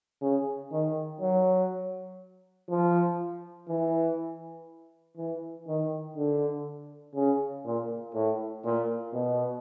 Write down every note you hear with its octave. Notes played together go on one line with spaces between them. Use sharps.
C#3
D#3
F#3
F3
E3
E3
D#3
D3
C#3
A#2
A2
A#2
B2